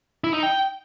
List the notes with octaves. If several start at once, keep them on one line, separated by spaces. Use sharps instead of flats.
E4
D#4
G5